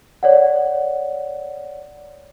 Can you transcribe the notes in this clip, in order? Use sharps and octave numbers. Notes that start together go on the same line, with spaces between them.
C#5 D5 F#5